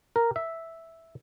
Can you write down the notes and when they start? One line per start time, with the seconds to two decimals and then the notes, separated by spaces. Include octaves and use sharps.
0.16 A#4
0.36 E5